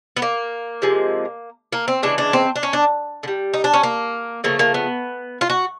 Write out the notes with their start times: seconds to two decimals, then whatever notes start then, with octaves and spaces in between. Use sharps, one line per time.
0.17 B3
0.22 A#3
0.82 C3 F3 G#3
1.72 A#3
1.88 C4
2.03 C#3 E3 G#3 D4
2.18 D4
2.33 C4
2.56 D4
2.63 C#4
2.73 D4
3.23 D3
3.28 G3
3.54 D#4
3.64 D4
3.74 C#4
3.83 A#3
4.44 C#3 F3 A3 A#3
4.59 A#3
4.74 B3
5.41 F4
5.50 F#4